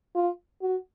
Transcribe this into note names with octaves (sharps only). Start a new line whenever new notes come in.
F4
F#4